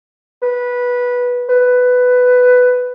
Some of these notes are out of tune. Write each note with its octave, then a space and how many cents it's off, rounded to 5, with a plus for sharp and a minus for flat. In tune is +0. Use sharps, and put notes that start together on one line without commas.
B4 -10
B4 +10